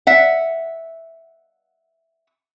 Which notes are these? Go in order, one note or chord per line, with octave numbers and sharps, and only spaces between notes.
E5 F#5